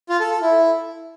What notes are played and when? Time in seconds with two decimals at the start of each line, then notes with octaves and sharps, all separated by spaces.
0.09 F4
0.20 A4
0.31 A4
0.42 E4